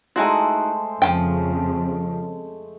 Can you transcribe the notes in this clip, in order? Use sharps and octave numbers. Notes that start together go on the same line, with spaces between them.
G#3 A3 D#4 E4 F#4 C5
F2 C#3 F3 E4 G5